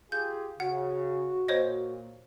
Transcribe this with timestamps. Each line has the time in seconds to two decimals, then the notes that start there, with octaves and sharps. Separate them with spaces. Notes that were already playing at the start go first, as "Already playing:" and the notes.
0.12 F4 G4 G#4 G6
0.60 C#3 F#4 F#5
1.48 A#2 C5 C#5 D#5